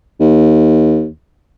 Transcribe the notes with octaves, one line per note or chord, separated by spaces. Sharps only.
D#2